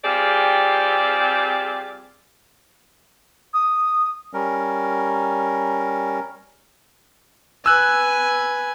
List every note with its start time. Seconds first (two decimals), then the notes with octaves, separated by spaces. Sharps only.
0.04 G3 C4 F4 G4 G#4 D5
3.54 D#6
4.34 G3 C#4 A#4
7.66 B4 G#5 E6 F#6